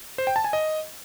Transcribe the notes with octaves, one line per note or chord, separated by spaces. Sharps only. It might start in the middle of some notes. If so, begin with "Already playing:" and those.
C5
G5
A5
G#5
D#5